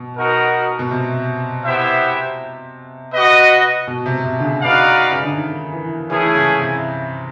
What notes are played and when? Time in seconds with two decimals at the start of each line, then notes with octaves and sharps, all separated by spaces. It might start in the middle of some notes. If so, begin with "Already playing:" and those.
Already playing: B2
0.17 B3 D#4 F#4 A#4
0.79 B2
0.91 C3
1.65 B3 E4 G4 C5 E5
3.13 F#4 B4 D#5
3.87 B2
4.06 C3
4.25 C3
4.39 D3
4.42 C#3
4.61 D#4 F#4 B4 D5 F5
5.10 C#3
5.23 D3
5.35 D#3
5.72 E3
6.10 E3 A3 C#4 E4 G#4
6.34 C#3
6.59 C3